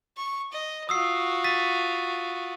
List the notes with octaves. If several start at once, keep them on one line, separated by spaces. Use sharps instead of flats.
C#6
D#5
F4 F#4 D#6 E6 C7
A6 B6 D#7